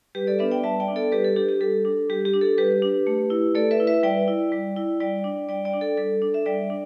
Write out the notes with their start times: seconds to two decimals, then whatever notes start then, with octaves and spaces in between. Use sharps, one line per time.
0.15 G3 G4 B4
0.27 A4 D5
0.39 B3 D4 B4 E5
0.51 D5 G5
0.63 G3 E5 A5
0.80 D5 G5
0.88 B3 D4
0.96 A4 D5
1.12 G3 G4 B4
1.24 A4
1.36 D4 G4
1.49 G4
1.61 G3 A4
1.85 D4
2.09 G3 G4
2.25 G4
2.34 D4
2.41 A4
2.58 G3 G4 B4
2.82 D4
3.07 A3
3.30 E4
3.55 A3 A4 D5
3.71 B4 E5
3.80 E4
3.87 B4 E5
4.03 G3 D5 G5
4.28 E4
4.52 G3
4.76 E4
5.00 G3 D5 G5
5.24 D4
5.49 G3 D5 G5
5.65 D5 G5
5.74 D4
5.81 A4 D5
5.97 G3 A4
6.22 D4
6.34 E5
6.46 G3 D5 G5
6.70 D4